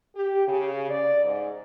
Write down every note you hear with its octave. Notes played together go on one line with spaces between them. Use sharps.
G4
C#3
D5
G#2